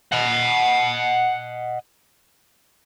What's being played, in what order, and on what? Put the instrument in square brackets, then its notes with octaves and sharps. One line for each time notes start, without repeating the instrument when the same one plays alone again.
[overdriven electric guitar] D#5 F#5